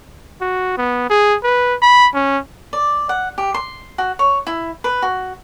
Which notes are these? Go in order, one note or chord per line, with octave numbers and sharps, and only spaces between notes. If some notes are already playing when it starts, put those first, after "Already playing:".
F#4
B3
G#4
B4
B5
C#4
D5
F#5
G4
C6
F#4
C#5
E4
B4
F#4